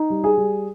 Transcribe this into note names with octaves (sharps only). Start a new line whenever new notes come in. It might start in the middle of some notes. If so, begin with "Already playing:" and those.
Already playing: D#4
G3
G#4
G3